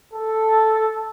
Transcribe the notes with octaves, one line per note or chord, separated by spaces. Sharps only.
A4